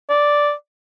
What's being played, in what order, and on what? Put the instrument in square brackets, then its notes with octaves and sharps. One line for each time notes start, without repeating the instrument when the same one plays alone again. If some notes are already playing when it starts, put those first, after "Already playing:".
[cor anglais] D5